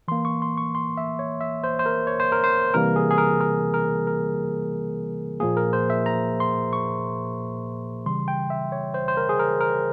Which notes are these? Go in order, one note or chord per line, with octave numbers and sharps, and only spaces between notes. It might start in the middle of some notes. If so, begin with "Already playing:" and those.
E3 A#3 C6
C#6
C6
C#6
C6
E5
C#5
E5
C5
C5
A#4
C#5
C5
A#4
C5
C3 E3 G3 A#3 A#4
G#4
G#4
A#4
A#4
A#4
A#4
A#2 F3 A#3 G#4
A#4
C5
E5
A#5
C6
C#6
C#3 E3 G3 C6
G5
E5
C#5
C5
C5
A#4
G#4
A#4
A#4